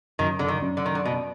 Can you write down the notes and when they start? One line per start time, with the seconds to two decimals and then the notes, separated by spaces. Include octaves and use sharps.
0.19 F#2 D#3
0.39 D3
0.48 D#3
0.62 F#2
0.77 D3
0.86 D#3
0.95 D3
1.05 B2